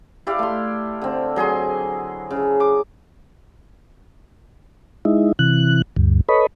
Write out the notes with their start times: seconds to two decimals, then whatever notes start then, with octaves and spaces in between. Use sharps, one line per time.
0.27 E4 G4 D5 F5
0.39 A3 C6
1.02 D3 C4
1.36 F#3 G#4 G#5 C6
2.31 C#3
2.60 D6
5.05 G#3 D#4 E4
5.39 C3 E3 F#6
5.96 D2 G2
6.29 A4 B4 C#5 D#5 B5